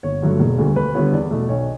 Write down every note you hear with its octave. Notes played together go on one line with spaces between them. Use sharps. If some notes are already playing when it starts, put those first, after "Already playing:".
G1 C#5
G2 D3 F#3 A3
E1
D2 D3 G3
D2 B4
D3 G3 B3 C#5
E2 D5
B2 A3
B1 C#5